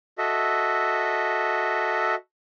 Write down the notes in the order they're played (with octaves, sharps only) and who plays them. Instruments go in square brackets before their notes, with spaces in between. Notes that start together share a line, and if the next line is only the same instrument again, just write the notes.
[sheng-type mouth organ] F#4 A4 D#5 E5